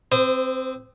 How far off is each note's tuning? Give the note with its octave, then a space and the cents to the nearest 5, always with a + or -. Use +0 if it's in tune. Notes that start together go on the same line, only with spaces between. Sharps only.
C4 +0 C5 -35 D#6 -25